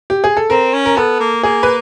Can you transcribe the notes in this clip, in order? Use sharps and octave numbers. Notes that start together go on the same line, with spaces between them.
G4
G#4
A4
C4 A#4
C#4
A#4
B3 A4
A#3
A#3 G#4
B4